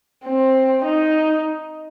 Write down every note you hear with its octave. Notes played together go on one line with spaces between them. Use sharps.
C4
D#4